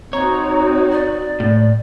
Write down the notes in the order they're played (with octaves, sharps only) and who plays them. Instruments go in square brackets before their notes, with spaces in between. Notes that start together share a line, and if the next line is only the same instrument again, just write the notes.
[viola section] C4 D#4 F#4 [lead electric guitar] C#5 [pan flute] A#5
[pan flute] D5
[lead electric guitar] A2